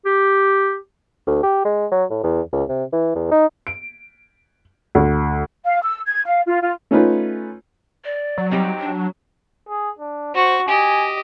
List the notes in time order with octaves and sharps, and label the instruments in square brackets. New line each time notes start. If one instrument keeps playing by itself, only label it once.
[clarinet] G4
[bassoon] D2
G4
G#3
F#3
A2
E2
C#2
C3
E3
E2
D#4
[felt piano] D7
D2
[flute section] F5
E6
G#6
F5
F4
F4
[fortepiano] A3 C#4 D#4 F4 B4
[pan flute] D5
[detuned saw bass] F#3
[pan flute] G3 [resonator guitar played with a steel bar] C4 D#4 G4
[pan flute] D4
[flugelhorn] G#4
D4
[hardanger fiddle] F#4 C#6 [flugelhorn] C5
[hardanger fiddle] G4 D#5 [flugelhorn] G#5